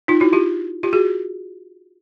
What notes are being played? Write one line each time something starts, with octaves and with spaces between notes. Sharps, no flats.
D#4 F4
E4 F#4
F4 G4
F4 G4
F#4 G#4